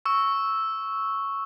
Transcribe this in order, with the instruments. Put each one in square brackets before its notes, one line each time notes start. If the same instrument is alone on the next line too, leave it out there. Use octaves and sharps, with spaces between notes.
[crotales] C#6 E6